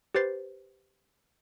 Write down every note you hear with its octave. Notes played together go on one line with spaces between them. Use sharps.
G4 B4 C5 A6 C7